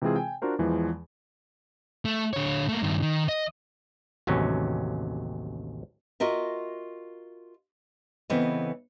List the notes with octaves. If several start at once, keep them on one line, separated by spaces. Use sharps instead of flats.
C3 E3 G#3 C4 F4 G#4
G5 G#5
D4 F4 F#4 A#4 C5
E2 E3 F3 G#3
A3
D3 C#5
A3 A#3
G2 D#3
D#3
D#5
A1 D#2 C3 F#3 C#4
F4 F#4 A#4 D#5 E5
C#3 E3 B3 C4 A4 D#5